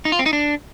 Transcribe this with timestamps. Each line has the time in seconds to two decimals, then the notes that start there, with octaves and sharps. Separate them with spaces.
0.05 D#4
0.12 F4
0.19 C4
0.26 D#4
0.33 D4